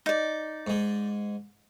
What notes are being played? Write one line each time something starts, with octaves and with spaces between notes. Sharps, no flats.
D#4 D5
G#2 G#3